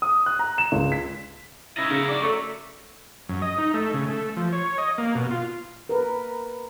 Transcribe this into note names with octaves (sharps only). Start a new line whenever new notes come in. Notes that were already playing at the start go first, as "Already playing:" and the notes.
D#6
F#6
A#5
E7
C#2
B6
C#4 D#4 E4 D#5
C#3 A#4 C#5
D5
F#3 A3 C#6
F#2
D#5
D#4
A3
C#3
A3
F3
C#5
D#5
A#3
B2
F4
A#4 B4